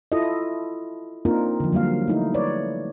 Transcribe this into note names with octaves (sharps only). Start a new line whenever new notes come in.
E4 F4 A4 D#5
A#3 C4 D4 D#4 F4 A#4
D3 F3
F#3 G3 A#3 F5
A3 D#4 E4
B4 C#5 D5